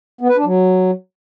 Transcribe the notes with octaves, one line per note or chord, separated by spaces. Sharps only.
B3
B4
D4
F#3